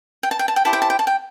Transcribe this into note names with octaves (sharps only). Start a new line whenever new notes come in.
G5
A5
G5
A5
G5
E4 G4 C5 A5
G5
A5
G5
A5
G5